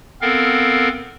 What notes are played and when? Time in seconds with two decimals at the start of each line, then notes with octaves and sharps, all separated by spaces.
0.21 B3 C4 A4 A#4 F5